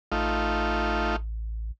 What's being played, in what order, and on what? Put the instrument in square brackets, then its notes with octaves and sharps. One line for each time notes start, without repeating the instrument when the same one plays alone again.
[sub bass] A1 [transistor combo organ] A3 D#4 F4